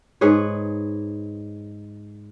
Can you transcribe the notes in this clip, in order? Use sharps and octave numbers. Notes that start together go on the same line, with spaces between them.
G#2 G#4 B4 C#5